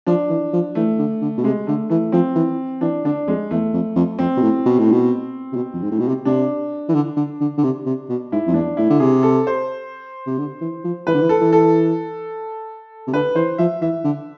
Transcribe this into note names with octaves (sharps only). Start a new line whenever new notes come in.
F3 D4
E3
F3
E3 A3
D3
D3
B2
C3 G#3
D3 A3
E3 A3
F3 C4
E3
E3 D4
D3 D4
F2 G#3
E2 A3
F2
F2
F2 C4
B2
A2
B2
A2
B2
C3
B2
F2
G#2
A2
B2
C3
C3 D4
E3
D3
D3
D3
D3
C3
C3
B2
G#2 E4
F2
E2 D4
A2 E4
D3
C3 G#4
A4
C5
C3
D3
E3
F3
E3 B4
D3
E3
A4
E3
A4
C3
D3 B4
E3 C5
F3 E5
E3 E5
D3